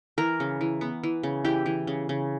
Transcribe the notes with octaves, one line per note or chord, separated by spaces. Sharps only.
E3 A#4
C#3
E3
B3
E3
C#3
E3 G4
E3
C#3
C#3